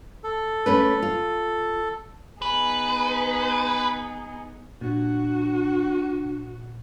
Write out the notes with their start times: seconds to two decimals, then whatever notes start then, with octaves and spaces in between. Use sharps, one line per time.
0.24 A4
0.66 A3 C#4 B4
1.02 F4
2.42 B3 D#4 G#4 B4
4.81 A#2 D4 F#4